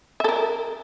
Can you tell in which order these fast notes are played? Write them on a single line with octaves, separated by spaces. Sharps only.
E5 A4 A#4